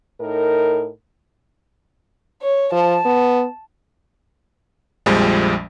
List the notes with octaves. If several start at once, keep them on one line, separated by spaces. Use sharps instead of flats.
A2 D#4 A#4
C#5
F3 A5
B3
A#1 F2 F3 G3 G#3